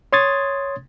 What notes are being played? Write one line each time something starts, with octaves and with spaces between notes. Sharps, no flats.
C#5 C6 D#6 G#6 A6